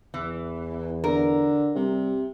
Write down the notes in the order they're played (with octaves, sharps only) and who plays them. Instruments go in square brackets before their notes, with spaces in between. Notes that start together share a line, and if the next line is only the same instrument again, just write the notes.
[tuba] E2 [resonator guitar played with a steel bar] E3
[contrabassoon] D3 [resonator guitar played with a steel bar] A#4
[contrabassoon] C3 [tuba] G3